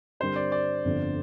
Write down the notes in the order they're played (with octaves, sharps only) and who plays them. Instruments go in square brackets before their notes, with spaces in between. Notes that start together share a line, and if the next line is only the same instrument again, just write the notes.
[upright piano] G2 D3 G3 C4 A#4 [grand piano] C5
[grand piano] D5
D5
[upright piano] G1 F2 D3 F3